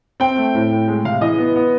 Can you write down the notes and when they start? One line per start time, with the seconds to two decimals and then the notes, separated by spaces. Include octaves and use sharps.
0.20 C4 G5
0.37 A3
0.54 A2
0.71 A2
0.88 G#3
1.05 C3 F5
1.21 E3 D#5
1.38 B3
1.56 B3